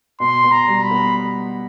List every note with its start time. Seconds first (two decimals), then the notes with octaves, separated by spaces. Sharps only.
0.20 B2 C6
0.44 B2
0.52 A#5
0.67 G3
0.83 B5
0.91 B3